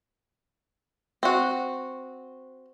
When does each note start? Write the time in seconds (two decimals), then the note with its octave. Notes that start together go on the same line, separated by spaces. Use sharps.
1.23 C4 F#4